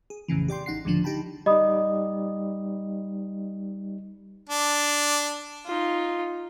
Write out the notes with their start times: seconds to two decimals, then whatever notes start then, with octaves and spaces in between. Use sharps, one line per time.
0.10 G#4
0.28 A1 F2 A2 C#3 E3
0.48 G4 D5 G5 C6
0.66 A1 D#4 F#5 C7
0.85 C#2 A2 D3 F3 D4
1.04 D#4 G4 G5 A5 B5
1.46 G3 D#4 D#5 B5 D#6
4.49 D4
5.66 D#4 F4